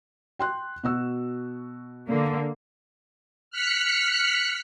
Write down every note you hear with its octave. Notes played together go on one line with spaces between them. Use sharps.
G5 C6 F#6
B2 F#4 E6
D3 A#3
F6 F#6 B6 C#7